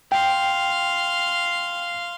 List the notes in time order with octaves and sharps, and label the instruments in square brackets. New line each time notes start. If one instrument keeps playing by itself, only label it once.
[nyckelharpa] F5 C6 [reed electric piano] G5